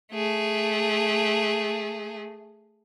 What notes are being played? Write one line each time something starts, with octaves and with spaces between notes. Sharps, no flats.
A3 G#4